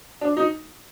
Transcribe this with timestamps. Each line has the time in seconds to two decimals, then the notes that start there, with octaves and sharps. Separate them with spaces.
0.21 D4
0.37 D#4